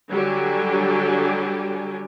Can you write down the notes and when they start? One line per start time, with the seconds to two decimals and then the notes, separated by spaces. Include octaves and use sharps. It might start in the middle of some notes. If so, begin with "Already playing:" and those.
0.13 D3 F#3 G3 G4 G#5